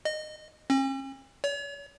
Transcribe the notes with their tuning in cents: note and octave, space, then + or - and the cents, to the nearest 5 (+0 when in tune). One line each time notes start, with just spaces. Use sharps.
D#5 -20
C#4 -45
C#5 +40